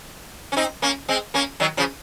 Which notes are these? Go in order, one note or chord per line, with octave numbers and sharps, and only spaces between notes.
C#4
C4 D#4
A#3 C#4
G#3 C4
A#3 C#4
D#3 F#3
C#3 F3